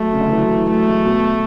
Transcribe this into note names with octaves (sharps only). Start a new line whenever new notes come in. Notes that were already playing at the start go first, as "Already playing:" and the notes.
Already playing: F#3 A3
C#3
D3
E3
F#3
E3
F#3 A3
G#3
B2